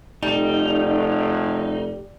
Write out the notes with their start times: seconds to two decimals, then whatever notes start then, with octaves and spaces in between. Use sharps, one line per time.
0.23 F1 G3 D#4